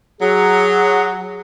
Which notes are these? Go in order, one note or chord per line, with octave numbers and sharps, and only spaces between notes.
F#3 G#4